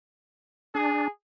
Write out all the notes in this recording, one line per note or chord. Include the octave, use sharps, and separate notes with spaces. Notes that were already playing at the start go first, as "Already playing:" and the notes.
D4 G#4